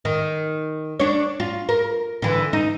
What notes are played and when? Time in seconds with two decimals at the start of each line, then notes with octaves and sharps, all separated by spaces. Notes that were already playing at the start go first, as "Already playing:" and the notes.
0.05 D#3
1.00 D4 C#5
1.40 F4
1.69 A#4
2.22 D3 E3
2.53 D#4